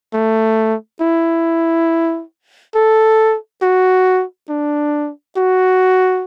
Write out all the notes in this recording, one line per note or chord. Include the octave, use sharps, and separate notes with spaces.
A3
E4
A4
F#4
D4
F#4